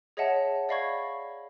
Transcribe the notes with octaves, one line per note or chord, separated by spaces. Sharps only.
G#4 C#5 D#5 E5 F#5 A5
D5 D#5 F5 B5 C#6 G#6